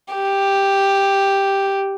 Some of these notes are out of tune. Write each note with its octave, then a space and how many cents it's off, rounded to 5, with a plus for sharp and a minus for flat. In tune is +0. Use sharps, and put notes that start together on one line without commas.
G4 +5